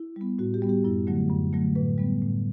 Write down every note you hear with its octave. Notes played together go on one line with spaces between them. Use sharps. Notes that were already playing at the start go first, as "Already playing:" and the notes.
Already playing: E4
G3 B3
A2 F#4
G4
G3 B3
G4
F#2 E4
D3 F#3 A3
F#2
D3 F#3 A3
A2 B4
G3 B3
A2